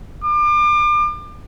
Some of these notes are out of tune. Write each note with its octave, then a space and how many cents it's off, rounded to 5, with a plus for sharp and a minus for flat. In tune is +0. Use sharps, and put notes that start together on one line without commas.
D6 +35